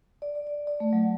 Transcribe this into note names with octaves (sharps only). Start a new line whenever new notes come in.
D5
D5
D5
D5
A3
F#3